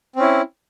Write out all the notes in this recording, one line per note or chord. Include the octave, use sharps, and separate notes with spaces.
C4 C#4 E4